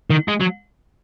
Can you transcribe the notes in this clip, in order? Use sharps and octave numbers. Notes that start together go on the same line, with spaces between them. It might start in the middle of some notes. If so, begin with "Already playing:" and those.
D#3
G#3
F#3